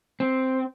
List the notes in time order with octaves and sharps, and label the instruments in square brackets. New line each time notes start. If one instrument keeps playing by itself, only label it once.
[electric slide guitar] C4